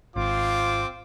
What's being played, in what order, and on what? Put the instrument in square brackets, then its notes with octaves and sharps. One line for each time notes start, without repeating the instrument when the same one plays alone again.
[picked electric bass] G#1 [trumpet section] C4 C5 D6 [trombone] F4